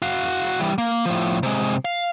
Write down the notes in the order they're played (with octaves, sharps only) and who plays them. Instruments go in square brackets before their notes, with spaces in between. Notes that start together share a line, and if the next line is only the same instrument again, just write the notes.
[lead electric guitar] F#4 F5
E3 G3
A#3
A2 F3
C3 G#3
F5